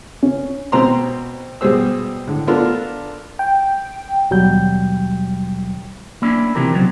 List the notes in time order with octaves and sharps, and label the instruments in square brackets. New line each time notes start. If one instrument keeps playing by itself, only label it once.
[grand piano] C#4
[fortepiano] B2 C4 A#5 C6
B2 G3 G#4 C5 E6
A2 D3
B3 D4 F4 A4 A#4
[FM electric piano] G5
[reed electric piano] D#2 B2 F#3 G3 G5 G6
[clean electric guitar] A#3 C#4 D4 E4
C3 E3 F3 G4 A#4
B2 F#3 C4